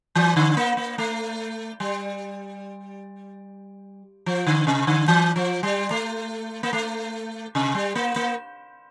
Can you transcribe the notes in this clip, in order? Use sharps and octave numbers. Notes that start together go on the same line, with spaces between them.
E3
D3
A#3
A#3
A3
G3
F3
D3
C3
D3
E3
F3
G3
A3
A#3
A3
C3
G3
A#3
A#3